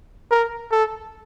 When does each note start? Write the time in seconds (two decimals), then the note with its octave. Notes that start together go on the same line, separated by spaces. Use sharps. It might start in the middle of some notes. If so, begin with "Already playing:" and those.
0.31 A#4
0.72 A4